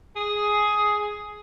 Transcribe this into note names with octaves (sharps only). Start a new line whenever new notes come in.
G#4